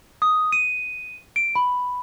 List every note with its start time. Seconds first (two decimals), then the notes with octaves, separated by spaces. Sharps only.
0.22 D#6
0.52 D#7
1.36 D7
1.55 B5